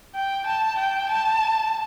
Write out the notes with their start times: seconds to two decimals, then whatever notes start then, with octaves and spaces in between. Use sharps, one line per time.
0.15 G5
0.46 A5
0.76 G5
1.09 A5